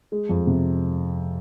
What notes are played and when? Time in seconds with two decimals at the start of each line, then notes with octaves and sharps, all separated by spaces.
0.12 G#3
0.29 F2
0.47 C3